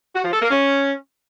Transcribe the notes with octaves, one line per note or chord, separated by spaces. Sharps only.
F#4
F3
A4
A#3
C#4